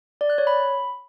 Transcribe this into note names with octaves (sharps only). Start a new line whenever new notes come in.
D5
F#6
C#5
B5